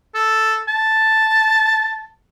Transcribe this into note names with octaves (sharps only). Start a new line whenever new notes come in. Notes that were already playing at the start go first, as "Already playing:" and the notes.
A4
A5